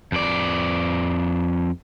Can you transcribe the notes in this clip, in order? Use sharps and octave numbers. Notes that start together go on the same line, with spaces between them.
F2 D5